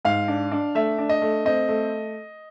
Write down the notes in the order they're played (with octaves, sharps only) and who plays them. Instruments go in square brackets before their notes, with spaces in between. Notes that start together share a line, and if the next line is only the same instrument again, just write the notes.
[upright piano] G#2 [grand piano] F5
[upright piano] D4
D4
[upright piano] A3 [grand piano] E5
[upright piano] D4
[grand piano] D#5
[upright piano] A3
[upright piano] C4 [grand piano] D#5
[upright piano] A3